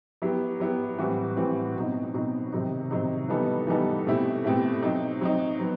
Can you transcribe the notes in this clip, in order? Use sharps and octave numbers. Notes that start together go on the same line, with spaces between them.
F#3 B3 E4 G4
F#3 B3 E4 G4
A2 E3 G3 C4 F#4
A2 E3 G3 C4 F#4
B2 F#3 C4 D#4
B2 F#3 C4 D#4
C3 D#3 F#3 C4 D#4
C3 D#3 F#3 C4 D#4
E3 G3 B3 D#4 A4
E3 G3 B3 D#4 A4
B2 A3 C4 E4 G4
B2 A3 C4 E4 G4
F#3 C4 D#4
F#3 C4 D#4
F#3 B3